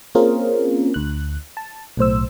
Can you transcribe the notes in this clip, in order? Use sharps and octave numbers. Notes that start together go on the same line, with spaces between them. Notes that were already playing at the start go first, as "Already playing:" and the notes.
A#3 C4 C#4 F4 G#4 A#4
D2 F#6
A5
B1 A2 C5 E6